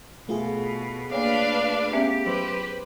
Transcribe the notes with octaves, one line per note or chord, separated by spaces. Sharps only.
B2 A3 F4 G#4
A#3 D4 B4 C#5 F5
B3 C#4 G4 E5
F#3 B4 C5